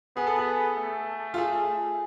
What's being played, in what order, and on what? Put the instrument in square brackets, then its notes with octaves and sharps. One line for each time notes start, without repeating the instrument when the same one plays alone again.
[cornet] B3 [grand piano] G#4
[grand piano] A4
G#4
[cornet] A3
[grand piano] F4
G#4